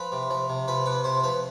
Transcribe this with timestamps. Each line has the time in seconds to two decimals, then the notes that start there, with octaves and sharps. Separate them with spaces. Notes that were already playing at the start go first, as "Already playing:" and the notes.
Already playing: F3 B4
0.12 C3
0.30 F3
0.49 C3
0.68 F3 B4
0.86 C3 B4
1.04 C3 C5
1.24 F3 B4